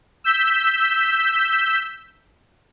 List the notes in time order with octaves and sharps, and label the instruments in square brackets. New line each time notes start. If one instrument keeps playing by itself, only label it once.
[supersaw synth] E6 G6 B6